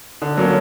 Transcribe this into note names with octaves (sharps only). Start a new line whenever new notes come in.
D3
F#3 A#3 C#4